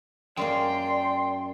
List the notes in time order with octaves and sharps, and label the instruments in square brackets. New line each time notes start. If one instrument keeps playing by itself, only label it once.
[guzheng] F#2 G#3 A#3 [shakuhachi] D5 [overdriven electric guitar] G5 [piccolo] C6